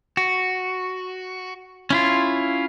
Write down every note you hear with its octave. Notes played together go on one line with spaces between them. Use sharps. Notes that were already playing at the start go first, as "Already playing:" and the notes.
F#4
C#4 E4 F4